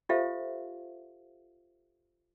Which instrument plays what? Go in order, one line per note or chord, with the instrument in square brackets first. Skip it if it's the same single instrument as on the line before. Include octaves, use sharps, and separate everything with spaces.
[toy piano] F4 G4 A4 C5 E5 F5